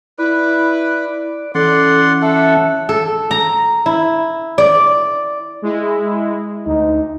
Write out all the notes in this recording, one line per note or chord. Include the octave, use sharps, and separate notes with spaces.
E4 B4 D5
E3 C#4 A4 D5 F#5 C6
A4 E5 F#5
A4
A#5
E4
D5
G#3 E4
D2 D#4